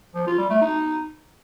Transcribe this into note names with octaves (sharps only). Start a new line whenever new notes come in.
F3
F4
G3
A3
D#4